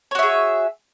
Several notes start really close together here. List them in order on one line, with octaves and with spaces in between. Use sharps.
C#5 F#4 E5 G#4